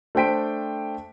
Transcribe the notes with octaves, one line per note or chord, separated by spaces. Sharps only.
A3 D4 C5 G5 B6 D7